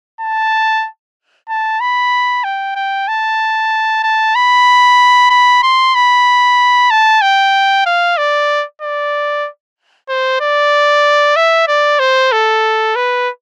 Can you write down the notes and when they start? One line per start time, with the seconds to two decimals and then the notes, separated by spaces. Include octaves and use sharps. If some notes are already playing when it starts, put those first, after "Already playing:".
0.21 A5
1.49 A5
1.81 B5
2.44 G5
2.76 G5
3.08 A5
4.04 A5
4.35 B5
5.31 B5
5.63 C6
5.95 B5
6.91 A5
7.22 G5
7.86 F5
8.18 D5
8.82 D5
10.09 C5
10.41 D5
11.36 E5
11.68 D5
12.00 C5
12.32 A4
12.96 B4